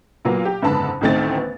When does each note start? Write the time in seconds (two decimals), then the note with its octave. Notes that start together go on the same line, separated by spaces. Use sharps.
0.25 A#2 F#3 A#3 B3
0.45 G4
0.62 F#1 G#2 D3 B3 A5 B5
1.01 A1 D2 D#3 A3 C4 A6
1.37 B3